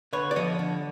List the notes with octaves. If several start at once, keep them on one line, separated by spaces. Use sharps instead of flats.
D3 B4 C#5
D5
F3 C#5 D#5
D3